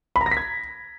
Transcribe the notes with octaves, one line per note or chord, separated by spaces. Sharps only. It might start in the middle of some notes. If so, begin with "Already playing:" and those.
B5
A#5
A#6
B6
G#6